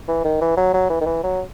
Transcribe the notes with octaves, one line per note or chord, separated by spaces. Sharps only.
E3
D#3
E3
F#3
F#3
E3
D#3
E3
F#3